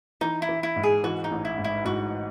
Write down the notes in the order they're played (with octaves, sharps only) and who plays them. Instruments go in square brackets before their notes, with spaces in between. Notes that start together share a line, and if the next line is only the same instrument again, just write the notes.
[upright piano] E3 [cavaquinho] D#4
[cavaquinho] E4
[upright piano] E3
[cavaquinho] E4
[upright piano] G#2
[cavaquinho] G#4
[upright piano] E3 [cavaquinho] F#4
[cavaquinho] D#4
[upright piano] A1
[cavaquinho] E4
[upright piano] G#2
[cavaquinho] E4
[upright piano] G#2 [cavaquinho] F#4